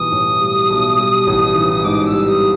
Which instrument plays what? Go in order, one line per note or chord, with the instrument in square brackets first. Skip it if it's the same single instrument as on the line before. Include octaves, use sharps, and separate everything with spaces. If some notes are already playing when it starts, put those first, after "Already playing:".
Already playing: [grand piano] B1 E3 G3 [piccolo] D#6
[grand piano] A2
G3
B1
G3
A1
E3
[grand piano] G#2 [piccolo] D6
[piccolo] E6
[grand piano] G3
[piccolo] D#6